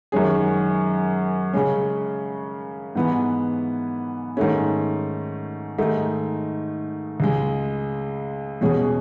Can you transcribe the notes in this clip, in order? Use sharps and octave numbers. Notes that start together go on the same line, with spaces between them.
F#2 D#3 G#3 C#4 G#4
C#3 G#3 C#4
G#2 E3 B3
G#2 D#3 A3 C#4
G#2 D#3 A3 D#4
C#2 C#3 G#3
E2 B2 G#3 C#4 G#4